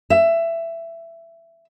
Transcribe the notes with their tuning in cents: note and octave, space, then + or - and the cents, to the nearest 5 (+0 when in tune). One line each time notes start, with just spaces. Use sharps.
E5 +15